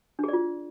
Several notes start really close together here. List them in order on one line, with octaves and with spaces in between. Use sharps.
D4 G#4 D5 F4